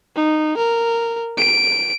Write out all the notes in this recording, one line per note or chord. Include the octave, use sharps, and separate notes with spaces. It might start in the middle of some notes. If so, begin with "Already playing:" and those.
D#4
A#4
D7